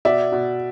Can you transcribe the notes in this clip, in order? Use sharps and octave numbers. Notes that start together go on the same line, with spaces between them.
B2 D5 E5
B2